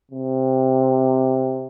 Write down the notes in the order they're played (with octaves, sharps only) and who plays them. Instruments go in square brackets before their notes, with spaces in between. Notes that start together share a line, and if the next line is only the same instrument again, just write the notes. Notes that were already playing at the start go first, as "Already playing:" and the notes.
[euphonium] C3